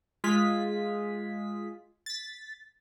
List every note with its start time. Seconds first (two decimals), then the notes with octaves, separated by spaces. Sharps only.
0.24 G#3 F4 G#4 B6
2.06 A6 B6